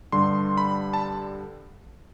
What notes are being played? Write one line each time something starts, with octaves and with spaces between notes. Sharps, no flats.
G2 D3 G3 C6
B5
A5